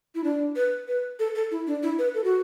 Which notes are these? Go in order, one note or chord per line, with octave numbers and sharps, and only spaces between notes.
E4
D4
B4
B4
A4
A4
E4
D4
E4
B4
A4
F#4